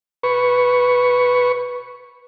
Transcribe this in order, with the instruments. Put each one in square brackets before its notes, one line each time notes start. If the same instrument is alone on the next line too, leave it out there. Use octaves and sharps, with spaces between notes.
[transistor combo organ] B4 C#6